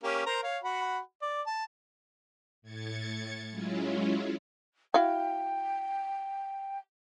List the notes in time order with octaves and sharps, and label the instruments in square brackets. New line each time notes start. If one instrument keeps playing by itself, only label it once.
[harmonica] A#3 C#4 G4
A#4 C5 A#5
C#5 F5
F#4 F#5 B5
D5
A5
[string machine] A2 G#6 A6 C#7
F#3 G#3 C#4 E4 F4
[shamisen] E4 F#4 F5 [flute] G5